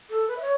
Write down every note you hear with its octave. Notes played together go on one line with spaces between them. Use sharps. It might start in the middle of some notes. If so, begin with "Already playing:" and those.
A4
B4
E5
C#5